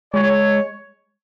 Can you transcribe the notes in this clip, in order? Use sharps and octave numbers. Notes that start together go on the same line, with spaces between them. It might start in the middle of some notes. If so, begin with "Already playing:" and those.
G#3 C#5